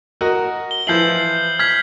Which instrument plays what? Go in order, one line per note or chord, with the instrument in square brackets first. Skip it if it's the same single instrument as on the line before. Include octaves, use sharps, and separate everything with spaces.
[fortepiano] F#4 A#4 D#5
[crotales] G7
[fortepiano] E3 F3 E4 [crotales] G6 C7 F#7
[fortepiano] F6 [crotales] G#6 B6